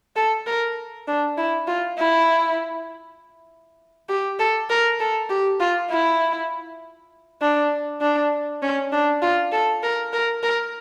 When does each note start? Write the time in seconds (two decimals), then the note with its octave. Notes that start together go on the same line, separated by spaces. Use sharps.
0.16 A4
0.47 A#4
1.07 D4
1.38 E4
1.67 F4
1.98 E4
4.09 G4
4.39 A4
4.70 A#4
5.00 A4
5.30 G4
5.60 F4
5.90 E4
7.41 D4
8.01 D4
8.62 C#4
8.92 D4
9.22 F4
9.52 A4
9.83 A#4
10.13 A#4
10.43 A#4